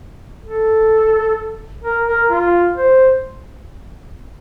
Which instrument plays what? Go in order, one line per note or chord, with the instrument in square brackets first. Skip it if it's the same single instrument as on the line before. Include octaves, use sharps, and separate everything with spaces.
[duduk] A4
A#4
A#4
F4
C5